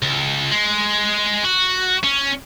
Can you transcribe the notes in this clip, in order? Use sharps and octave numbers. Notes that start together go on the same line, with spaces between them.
C#2
G#3
F#4
C#4